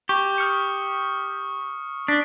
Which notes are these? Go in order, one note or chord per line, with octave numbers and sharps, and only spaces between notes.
G4 C#6
D#6 F6 C#7
D4 B6